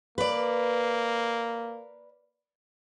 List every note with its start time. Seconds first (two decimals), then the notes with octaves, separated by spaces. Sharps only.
0.18 A#3 B4 D5